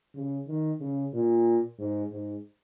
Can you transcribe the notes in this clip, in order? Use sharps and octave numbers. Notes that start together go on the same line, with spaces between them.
C#3
D#3
C#3
A#2
G#2
G#2